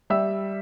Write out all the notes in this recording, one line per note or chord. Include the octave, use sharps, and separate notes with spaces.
G3 E5 E6